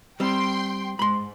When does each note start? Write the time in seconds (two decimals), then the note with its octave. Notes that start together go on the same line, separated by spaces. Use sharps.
0.20 G3 C4 G5 C6
0.99 G#2 B5 C6